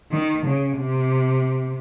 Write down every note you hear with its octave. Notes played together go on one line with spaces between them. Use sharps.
D#3
C#3
C3